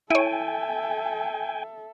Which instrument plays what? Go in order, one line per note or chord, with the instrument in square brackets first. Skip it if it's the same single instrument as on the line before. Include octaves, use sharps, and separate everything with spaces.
[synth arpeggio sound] E4 C#5 [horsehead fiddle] A4 E5 [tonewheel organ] G5 G#5